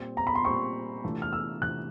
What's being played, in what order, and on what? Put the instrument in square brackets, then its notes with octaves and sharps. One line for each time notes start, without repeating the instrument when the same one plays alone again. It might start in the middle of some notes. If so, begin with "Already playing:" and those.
Already playing: [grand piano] A#2 G3 C4
[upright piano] A#5
B5
C6
[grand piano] A#2 G3 C4 [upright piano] C#6
[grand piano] C3 E3 A3 D4 F4
[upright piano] F6
E6
[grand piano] C3 E3 A3 D4 F4 [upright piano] F#6